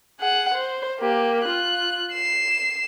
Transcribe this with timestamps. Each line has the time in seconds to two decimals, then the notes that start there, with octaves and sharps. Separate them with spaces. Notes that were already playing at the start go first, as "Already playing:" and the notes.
0.19 G#4 F#5
0.53 C5
1.00 A#3 G4
1.44 F4 F#6
2.13 C7 E7